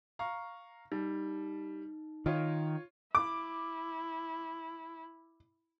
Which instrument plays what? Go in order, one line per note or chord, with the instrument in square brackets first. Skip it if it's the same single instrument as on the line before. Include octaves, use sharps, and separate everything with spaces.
[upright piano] F5 A#5 C#6
[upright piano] G3 [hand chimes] D#4
[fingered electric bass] D#3 [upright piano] F4 C#5
[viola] E4 [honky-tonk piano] D6